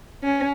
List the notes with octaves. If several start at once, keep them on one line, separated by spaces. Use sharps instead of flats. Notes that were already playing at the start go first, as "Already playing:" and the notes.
C#4